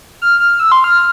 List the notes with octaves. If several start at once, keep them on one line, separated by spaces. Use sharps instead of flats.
F6
F6
E6
C6
F6